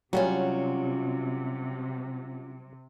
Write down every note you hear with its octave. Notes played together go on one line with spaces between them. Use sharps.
C3 F#3 G3 C#4 F4 F#4